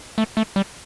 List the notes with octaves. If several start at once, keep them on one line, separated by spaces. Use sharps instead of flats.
A3
A3
G3